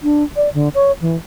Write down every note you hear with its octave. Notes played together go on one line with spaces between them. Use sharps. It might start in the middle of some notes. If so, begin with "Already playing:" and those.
D4
D5
D3
C#5
E3